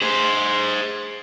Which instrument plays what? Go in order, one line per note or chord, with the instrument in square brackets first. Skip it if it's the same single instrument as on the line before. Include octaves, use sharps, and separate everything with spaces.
[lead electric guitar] G#4 C5